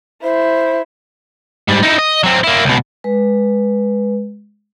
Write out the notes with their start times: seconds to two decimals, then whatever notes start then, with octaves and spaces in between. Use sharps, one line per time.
0.23 E4 C5
1.69 G#2 G3
1.83 D#4 E4
1.99 D#5
2.24 F#3 C4
2.44 A#3 E4
2.65 C#2 B2
3.04 G#3 B4